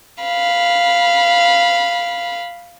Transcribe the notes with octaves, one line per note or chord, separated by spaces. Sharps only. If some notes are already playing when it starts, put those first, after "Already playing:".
F5 B5